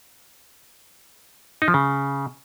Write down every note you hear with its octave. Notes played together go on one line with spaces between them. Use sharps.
D#4
F3
C#3